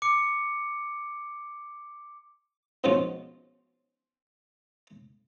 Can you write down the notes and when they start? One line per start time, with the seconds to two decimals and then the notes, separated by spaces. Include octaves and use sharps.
0.02 D6 C#7
2.84 G#2 B2 F3 C#4 F4